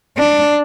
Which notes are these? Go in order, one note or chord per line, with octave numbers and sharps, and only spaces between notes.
D4